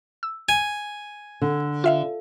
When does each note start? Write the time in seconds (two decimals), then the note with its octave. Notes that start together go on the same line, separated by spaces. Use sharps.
0.23 E6
0.49 G#5
1.42 D3
1.84 F4 E5 F5